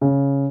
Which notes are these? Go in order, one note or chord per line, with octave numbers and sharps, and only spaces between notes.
C#3